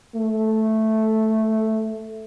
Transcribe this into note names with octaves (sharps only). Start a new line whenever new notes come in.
A3